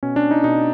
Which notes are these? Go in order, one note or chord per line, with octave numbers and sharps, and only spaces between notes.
B2 C#4
D4
D#4
B2 D#4